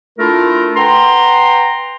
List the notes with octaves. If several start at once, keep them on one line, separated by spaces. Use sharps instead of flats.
A3 D4 E4 F4 A4 A#4
B4 F#5 G5 A#5 C6